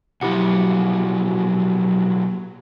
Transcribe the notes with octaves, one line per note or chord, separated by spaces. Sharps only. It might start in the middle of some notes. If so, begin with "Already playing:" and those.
B1 F3 F#3 E4 G4 F#5